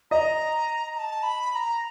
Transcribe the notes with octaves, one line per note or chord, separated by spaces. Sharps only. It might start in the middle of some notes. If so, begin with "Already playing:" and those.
D#5 A#5
A#5
A5
B5
B5
A#5